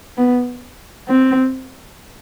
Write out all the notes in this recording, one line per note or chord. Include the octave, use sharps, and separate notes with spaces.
B3
C4